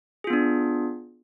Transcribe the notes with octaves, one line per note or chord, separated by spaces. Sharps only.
B3 D4 F4 G#4